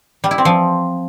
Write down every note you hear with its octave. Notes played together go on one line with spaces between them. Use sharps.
G3
E4
C4
F3